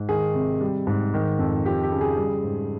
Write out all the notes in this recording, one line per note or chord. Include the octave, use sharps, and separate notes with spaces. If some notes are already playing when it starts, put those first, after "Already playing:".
Already playing: G#2
D#3 G#4
C3
G3
G#2
D#3
F2
F3 G4
G4
C#3
G#4
G3
G#2